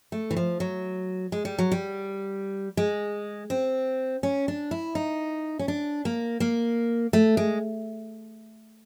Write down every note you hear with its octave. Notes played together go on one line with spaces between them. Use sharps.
A3
E3
F3
F#3
G#3
G3
F#3
G3
G#3
C4
C#4
D4
E4
D#4
C#4
D4
A#3
A#3
A3
G#3